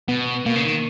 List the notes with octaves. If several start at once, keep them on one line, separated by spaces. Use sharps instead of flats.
B2 B3
B2 A#3
C#3
D#3